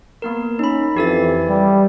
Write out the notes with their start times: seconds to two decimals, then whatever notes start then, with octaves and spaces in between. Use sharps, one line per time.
0.22 A#3 B3 A#4
0.59 C#4 D#4 B5
0.97 F2 E3 G4 A4 A6
1.49 G3